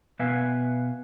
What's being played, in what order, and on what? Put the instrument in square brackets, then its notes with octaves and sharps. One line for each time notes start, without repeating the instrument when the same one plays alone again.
[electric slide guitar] B2 B3 B4 E5 F5 G#5